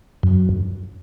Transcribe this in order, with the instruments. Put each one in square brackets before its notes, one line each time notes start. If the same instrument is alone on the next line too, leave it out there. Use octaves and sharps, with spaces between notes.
[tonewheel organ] F#2